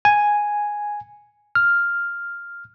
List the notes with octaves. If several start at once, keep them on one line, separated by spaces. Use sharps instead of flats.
G#5
F6